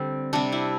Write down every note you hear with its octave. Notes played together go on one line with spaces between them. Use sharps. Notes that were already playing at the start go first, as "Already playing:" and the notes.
Already playing: D3 G3 C4
C3 G3 D4
E4